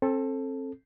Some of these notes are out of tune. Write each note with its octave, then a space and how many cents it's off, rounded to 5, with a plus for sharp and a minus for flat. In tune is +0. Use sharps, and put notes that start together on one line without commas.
C4 +30 A4 +0